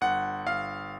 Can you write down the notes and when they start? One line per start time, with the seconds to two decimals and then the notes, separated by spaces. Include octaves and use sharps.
0.01 G1 F#5
0.46 G1 F5